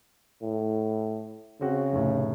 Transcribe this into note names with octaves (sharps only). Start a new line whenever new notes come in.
A2
C#3 C4 F#4
F1 A2